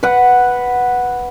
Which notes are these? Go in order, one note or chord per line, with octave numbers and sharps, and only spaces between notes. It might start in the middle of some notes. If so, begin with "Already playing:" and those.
B4 F#5